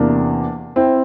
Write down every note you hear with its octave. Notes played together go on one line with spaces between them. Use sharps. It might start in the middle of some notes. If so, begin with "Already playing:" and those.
Already playing: E2 C3 E3 A#3 D4
C4 E4